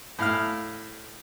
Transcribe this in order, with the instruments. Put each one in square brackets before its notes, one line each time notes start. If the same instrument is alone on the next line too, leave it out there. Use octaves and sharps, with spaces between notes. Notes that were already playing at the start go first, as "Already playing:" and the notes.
[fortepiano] A2 F5 F6